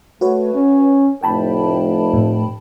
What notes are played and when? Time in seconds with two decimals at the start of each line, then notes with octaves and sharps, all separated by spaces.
0.21 A3 F#4 B4 C#5
0.54 C#4
1.23 F1 A2 G5 A5 B5
2.13 A2